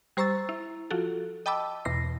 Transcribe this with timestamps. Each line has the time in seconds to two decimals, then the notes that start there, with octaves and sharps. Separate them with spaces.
0.17 G3 C5 A#5 C#6 E6 A6
0.49 E4
0.91 F3 F4 F#4 A4
1.46 D#5 G5 A5 B5 D6 E6
1.85 E2 B2 E3 A#6 C7